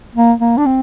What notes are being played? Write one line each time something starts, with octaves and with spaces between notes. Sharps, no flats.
A#3
A#3
D4
C4